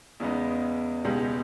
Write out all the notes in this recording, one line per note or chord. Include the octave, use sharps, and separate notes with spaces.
E2 C#3 G#3 B3 D#4
C#2 B2 G#3 D#4 G4